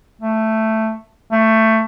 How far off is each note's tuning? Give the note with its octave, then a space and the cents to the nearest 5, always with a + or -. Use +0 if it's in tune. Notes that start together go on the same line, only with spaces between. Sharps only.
A3 +5
A3 +15